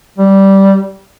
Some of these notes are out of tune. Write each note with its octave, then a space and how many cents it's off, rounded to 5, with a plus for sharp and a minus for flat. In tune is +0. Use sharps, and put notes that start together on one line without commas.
G3 -10